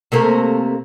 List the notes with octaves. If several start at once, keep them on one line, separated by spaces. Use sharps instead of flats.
C3 A3 A#3